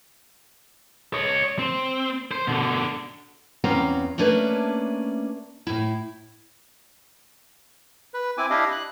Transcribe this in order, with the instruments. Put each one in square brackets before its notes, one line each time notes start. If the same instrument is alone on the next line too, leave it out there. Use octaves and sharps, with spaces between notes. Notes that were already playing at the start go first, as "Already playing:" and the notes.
[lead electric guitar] C#5 D#5
C4
C5
B2 D3
[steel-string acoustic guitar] E2 C4 C#4 B4 F5 A#5
A3 A#3 C#4 D4 B4 E5
A2 E4
[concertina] B4
C4 E4 G#5 D6
D4 E4 G4 D#5 F5
F#6